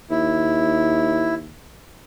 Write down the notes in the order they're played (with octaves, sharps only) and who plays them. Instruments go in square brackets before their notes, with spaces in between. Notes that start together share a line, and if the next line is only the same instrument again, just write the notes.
[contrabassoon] D#2 [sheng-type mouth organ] E4